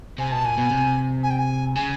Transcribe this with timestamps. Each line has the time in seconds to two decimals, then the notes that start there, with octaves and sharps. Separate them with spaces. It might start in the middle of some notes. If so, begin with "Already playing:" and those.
0.18 C3 G#5
0.32 B2 A5
0.45 A#2 G#5
0.58 B2
0.71 C3
1.23 G#5
1.30 G5
1.38 G#5
1.75 C#3 G#5